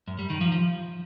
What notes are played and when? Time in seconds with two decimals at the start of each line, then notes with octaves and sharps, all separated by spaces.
0.08 F#2
0.19 G3
0.30 D#3
0.41 F3
0.52 F3